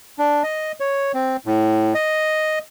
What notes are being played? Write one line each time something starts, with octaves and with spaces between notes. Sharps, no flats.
D4
D#5
C#5
C4
A2
D#5